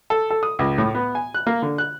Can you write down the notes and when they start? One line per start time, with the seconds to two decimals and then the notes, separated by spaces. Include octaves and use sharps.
0.10 A4
0.30 A4
0.43 D#6
0.59 C#2
0.78 A2
0.95 B3
1.15 G#5
1.34 F#6
1.47 A#3
1.62 D3
1.78 F#6